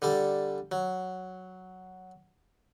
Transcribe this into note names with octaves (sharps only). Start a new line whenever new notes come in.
D3 G3 A4
F#3